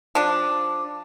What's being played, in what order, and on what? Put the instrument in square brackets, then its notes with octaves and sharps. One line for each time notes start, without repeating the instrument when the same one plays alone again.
[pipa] F3 D4